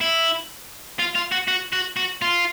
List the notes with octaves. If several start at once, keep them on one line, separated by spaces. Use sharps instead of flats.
E4
F4
F4
F#4
F#4
F#4
F#4
F4